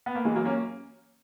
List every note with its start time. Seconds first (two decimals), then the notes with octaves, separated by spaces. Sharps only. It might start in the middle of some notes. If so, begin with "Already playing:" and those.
0.06 B3
0.15 A#3
0.25 E3 G#3
0.35 F#3 A#3
0.45 A#3 C#4